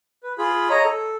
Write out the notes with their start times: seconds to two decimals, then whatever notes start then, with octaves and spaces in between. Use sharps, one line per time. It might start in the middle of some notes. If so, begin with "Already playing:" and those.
0.23 B4
0.38 F4 G#4 B5
0.70 C#5 D#5 A#5
0.85 A4